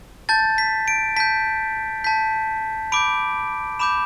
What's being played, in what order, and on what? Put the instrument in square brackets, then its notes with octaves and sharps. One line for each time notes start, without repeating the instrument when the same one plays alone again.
[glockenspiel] A5 G6 A6
B6
D7
A5 G6 B6
A5 G6 B6
B5 D6 G6 D7
B5 D6 G6 E7